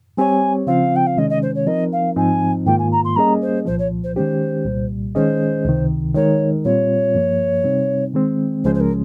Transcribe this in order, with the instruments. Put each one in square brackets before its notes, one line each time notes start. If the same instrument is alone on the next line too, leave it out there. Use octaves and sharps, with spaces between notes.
[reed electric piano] G3 C4 G4 C#5 [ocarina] G#5
[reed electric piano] C#3 F3 C4 F4 [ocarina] F5
[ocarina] G5
F5
[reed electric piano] C3 D#3 G#3 C#4 [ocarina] D#5
[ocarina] D#5
C5
C#5
[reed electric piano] F3 C4 D#4 A#4 [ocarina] D#5
[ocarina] F5
[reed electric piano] G#2 F3 C4 D#4 [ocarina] G#5
[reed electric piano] G#2 D#3 A#3 F4 [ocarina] G5
[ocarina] G#5
A#5
C6
[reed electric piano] G3 A#3 C#4 G#4 D#5 [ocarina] A#5
[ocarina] C5
[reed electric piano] C2 A#2 F3 [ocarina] C5
[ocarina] C#5
C5
[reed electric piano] D#3 G#3 C#4 G4 [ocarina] C5
[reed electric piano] C2 A#2 G3
[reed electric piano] D#3 G#3 C#4 G#4 D#5 [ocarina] C5
[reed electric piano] C#2 C3 D#3
[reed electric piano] D#3 G#3 D#4 A#4 [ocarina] C#5
[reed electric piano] A#2 G3 C4 F4 [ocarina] C#5
[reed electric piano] G2 F3 A#3
C3 G3 C4 D#4
D#3 G#3 C4
[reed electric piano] C#2 C#3 F3 G#3 C#4 [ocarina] C5
[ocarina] C5
A#4